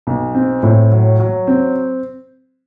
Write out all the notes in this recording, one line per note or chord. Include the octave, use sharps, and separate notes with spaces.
B1
C4
A2
F#3
F#3
C4